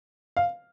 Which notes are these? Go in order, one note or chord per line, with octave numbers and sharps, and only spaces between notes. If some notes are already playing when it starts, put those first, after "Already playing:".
F5